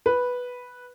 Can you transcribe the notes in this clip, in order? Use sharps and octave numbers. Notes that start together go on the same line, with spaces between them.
B4